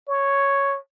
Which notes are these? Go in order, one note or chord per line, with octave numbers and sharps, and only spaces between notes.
C#5